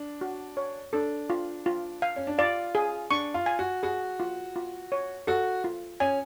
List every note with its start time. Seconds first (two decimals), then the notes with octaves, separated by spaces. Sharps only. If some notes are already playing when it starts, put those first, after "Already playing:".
Already playing: D4
0.21 F#4
0.57 C#5
0.93 D4 A4
1.30 F4
1.66 F4
2.02 F5
2.16 C#4
2.27 D4
2.38 F4 D5
2.75 G#4
3.10 D4 C#6
3.34 F4
3.46 G#5
3.59 F#4
3.83 F#4 G#4
4.20 F4
4.56 F4
4.92 C#5
5.27 F#4 A4
5.64 F4
6.00 C#4 G#5